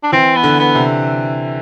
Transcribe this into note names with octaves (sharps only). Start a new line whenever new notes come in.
D4
E3 C4
B3
D3
B3
C3